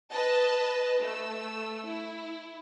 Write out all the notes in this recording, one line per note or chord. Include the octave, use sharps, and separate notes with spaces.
B4 D#5 A5
A3 E6
E4